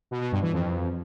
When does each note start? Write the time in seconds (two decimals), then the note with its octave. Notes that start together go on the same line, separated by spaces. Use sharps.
0.11 B2
0.21 B2
0.32 G2
0.42 E3
0.53 F2